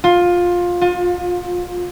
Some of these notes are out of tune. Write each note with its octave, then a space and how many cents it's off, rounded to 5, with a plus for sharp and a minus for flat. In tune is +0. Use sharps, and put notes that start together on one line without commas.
F4 +15
F4 +35